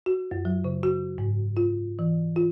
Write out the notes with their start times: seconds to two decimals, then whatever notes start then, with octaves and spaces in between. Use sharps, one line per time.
0.06 F#4
0.31 F#2
0.45 F#3
0.64 C#3
0.83 F#4
1.18 G#2
1.57 F4
1.99 E3
2.36 F4